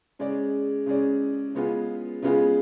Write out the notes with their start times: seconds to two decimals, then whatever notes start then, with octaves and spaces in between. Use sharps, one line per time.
0.19 C#3 G#3 C#4 G#4 D5
0.86 C#3 G#3 C#4 G#4 D5
1.55 C#3 G#3 B3 F4 G#4
2.23 C#3 G#3 B3 F4 G#4